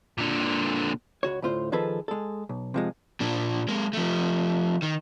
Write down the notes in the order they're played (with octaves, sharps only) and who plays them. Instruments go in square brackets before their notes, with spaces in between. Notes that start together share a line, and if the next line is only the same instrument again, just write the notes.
[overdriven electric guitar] A#2 D3
[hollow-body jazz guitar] C#2 F#4 C#5
D2 A2 F4 C5
D#3 F3 G#4 A4 B4
G#3 A4
B1
C3 F3 G#3
[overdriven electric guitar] A#2 D4
G#3 A#3
F3 A3
D#3